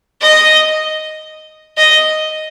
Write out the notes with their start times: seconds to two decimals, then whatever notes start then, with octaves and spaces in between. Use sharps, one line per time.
0.21 D#5
1.77 D#5